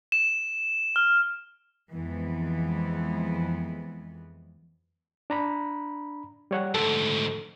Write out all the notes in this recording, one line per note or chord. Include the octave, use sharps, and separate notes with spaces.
E7
F6
F2 E3 G#3 B3
D4 A#5 B5
G3 C#5 F#5
D2 G#2 A4